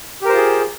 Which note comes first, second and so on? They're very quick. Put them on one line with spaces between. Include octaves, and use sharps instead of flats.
G4 A#4 C5 F4 G#4